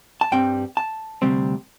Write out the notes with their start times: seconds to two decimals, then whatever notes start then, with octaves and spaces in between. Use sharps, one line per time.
0.21 A5
0.32 G2 G3 C4 G5
0.77 A5
1.22 D2 C3 G3 C4